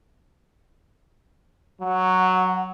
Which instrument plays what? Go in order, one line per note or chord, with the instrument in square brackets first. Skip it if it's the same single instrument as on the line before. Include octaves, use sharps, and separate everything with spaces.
[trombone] F#3 [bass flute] F#5